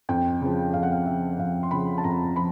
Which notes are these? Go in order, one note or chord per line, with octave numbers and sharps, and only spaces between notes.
F2 G5
C#3 F3
F2 F5
F#5
F5
C#3 F3 E5
F2 F5
C6
C#3 F3 B5
A5
F2 A#5
F3 B5